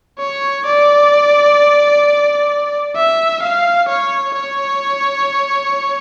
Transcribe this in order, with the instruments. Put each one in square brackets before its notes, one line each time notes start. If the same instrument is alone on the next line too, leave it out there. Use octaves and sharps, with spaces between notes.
[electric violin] C#5
D5
E5
F5
C#5
C#5